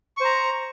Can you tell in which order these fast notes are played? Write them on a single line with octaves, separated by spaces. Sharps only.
C#6 C5 A#5